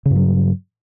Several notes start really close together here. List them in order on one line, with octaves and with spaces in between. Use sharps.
C#3 G2 F#3